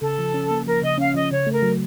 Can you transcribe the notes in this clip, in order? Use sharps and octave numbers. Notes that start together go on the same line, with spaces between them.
C#3 A4
F3
C#4
A#3
F3 A#4
C#3 D#5
C#4 F5
F3 D#5
C#3 C#5
A3
A#4
F#3